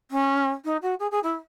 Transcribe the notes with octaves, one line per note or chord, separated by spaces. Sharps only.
C#4
D#4
F#4
G#4
G#4
E4